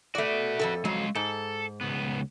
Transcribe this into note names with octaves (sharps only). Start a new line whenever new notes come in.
A3 F#4 B4 D5
F2 C3 A4
F2 F#3 G#3 F5
G#2 A4
C#2 B3